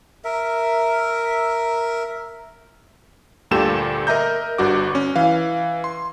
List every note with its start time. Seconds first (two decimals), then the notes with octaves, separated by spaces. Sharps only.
0.24 A#4 E5
3.51 D2 G2 A#2 G4 A4 E7
4.07 A#4 D#5 E5 A#5 G6
4.58 G1 G2 F#4 D6
4.95 C#4
5.16 E3 F5
5.84 C6